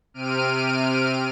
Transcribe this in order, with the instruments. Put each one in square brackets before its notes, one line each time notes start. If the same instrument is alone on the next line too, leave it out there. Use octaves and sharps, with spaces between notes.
[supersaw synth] C3 F6 D7 D#7